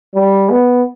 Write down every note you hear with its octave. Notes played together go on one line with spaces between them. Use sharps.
G3
B3